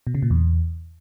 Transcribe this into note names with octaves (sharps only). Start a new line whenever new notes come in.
B2
C#3
A#2
E2